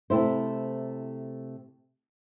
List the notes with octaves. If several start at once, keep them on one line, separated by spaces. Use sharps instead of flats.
C3 A3 E4 C5